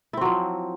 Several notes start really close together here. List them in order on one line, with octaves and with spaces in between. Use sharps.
E4 C4 F#3 F3